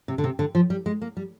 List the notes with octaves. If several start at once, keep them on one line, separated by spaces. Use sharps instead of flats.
C3
D3
C3
D3
F3
G3
G#3
A#3
G3